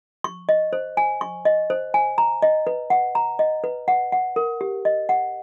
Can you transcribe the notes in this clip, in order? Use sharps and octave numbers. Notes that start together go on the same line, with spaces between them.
C#6
D#5
C5
G#5
C#6
D#5
C5
G#5
A#5
D#5
B4
F#5
A#5
D#5
B4
F#5
F#5
A#4
G4
D#5
F#5